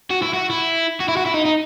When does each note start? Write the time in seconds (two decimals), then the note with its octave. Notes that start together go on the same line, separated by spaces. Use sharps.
0.10 F#4
0.22 E4
0.34 F#4
0.50 E4
1.00 F#4
1.08 E4
1.17 F#4
1.26 E4
1.34 D#4
1.45 D#4